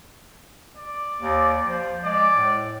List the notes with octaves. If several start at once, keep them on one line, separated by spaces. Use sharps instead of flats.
D5
D#2
F3
G#3 D5
A2